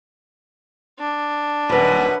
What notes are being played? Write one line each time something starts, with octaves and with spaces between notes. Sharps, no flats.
D4
D#1 F#2 B2 B4